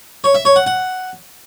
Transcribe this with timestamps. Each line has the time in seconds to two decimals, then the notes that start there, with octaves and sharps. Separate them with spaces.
0.24 C#5
0.35 E5
0.45 C#5
0.56 F#5
0.67 F#5